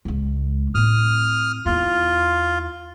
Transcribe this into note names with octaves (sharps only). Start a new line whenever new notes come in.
C#2 G#3
A2 C4 D#6 F6
E2 E4 F4